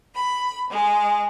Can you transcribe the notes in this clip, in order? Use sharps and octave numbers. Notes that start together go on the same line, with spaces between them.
B5
G#3